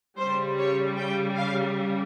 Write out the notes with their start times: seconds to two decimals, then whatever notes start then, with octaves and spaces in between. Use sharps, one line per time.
0.18 C#3 G3 C5
0.59 C#5
0.98 G5
1.38 F5